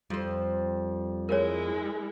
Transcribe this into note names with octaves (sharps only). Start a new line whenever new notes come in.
F2 G3 C5
G#3 E4 A#4 C#5